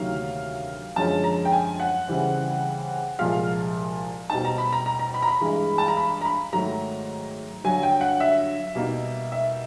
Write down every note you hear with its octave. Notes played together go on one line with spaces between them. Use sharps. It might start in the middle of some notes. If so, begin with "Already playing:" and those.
Already playing: D2 C3 D#3 F#3 A#3 F5
F#2 D3 F3 G#3 C#4 A5
A#5
G5
G#5
F#5
C#3 E3 G3 C4
C2 A#2 F3 G#3 F5
B2 G3 C4 D#4 A5
A#5
B5
A#5
A#5
A#5
B5
A#5
B5
G2 E3 G#3
A5
A#5
B5
A#5
B5
G#2 D#3 F#3 A3 A#5
G2 D3 F#3 G#5
G5
F#5
E5
B2 G3 A#3 D#4
E5